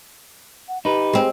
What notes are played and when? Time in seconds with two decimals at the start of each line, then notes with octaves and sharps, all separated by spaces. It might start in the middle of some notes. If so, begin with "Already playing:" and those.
0.68 F#5
0.85 D#4 G4 B4
1.13 G#3 C4